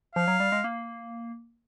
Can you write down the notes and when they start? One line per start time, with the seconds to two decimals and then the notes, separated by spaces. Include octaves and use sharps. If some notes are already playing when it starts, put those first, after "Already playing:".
0.15 F3 F5
0.28 F#3
0.40 G3
0.52 G#3
0.64 A#3